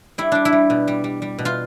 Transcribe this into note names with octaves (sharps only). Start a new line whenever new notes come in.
G3 E4
G3 D4
E4
G3
B2
G3
G3
G3
B2
F4